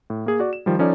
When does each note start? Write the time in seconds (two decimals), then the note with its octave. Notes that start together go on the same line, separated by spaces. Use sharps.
0.10 A2
0.26 A#3 G#4
0.40 F#4 D5
0.53 E7
0.66 D#3 F3 G3
0.79 F3 C#4 D#4 A4 D5